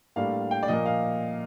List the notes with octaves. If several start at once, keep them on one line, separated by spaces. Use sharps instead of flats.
A2 G3 A#3 D4 F5
G5
D5
A#2 F3 A#3 D#5
F5